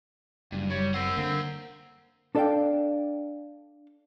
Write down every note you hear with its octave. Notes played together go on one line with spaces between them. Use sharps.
F#1 G2
G3 C#5
C4 A#4 F#5
D3 A#3 C4
D4 A4 D5 E5 F5 G5